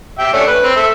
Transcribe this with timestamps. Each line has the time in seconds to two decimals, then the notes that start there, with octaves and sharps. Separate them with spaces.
0.19 G4 E5 G5
0.33 A3 C#4 D4
0.48 B4
0.63 C4
0.76 A4 E5